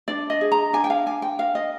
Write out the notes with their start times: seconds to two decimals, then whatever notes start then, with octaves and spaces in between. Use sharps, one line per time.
0.08 D4 D5
0.30 D#5
0.41 G#4
0.52 A#5
0.73 D4 G#5
0.84 G5
0.90 F5
1.06 D4 G#5
1.22 G5
1.39 A#4 F5
1.55 D#5